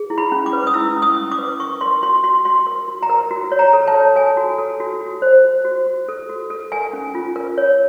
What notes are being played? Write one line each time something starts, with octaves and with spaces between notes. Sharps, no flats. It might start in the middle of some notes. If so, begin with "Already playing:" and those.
Already playing: G#4
E4
B5
C#4
D6
B4
D#6
E4 E6
C#4
D#6
C#4
D6
B4
A#4 C#6
A#4 C6
F#4 C6
F#4 C6
F#4 C6
A#4
F#4
A#5
A#4
F#4
C#5
A#5
A4
A5
C#5
A4 G#5
F#4
A4
F#4
F#4
C5
C5
F#4
F#4
A4
F#4
A4
A#4 G#5
C#4
F4
A#4
C#5